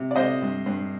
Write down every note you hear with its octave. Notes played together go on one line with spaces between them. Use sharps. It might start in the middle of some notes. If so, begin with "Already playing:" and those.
Already playing: C3
D5
C3 C5 D#5
G2
G2